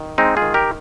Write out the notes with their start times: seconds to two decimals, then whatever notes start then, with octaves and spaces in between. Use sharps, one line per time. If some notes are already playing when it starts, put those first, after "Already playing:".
Already playing: D#3
0.18 G#3 C4 D#4
0.37 F4 G#4
0.42 D#3
0.54 G4 A#4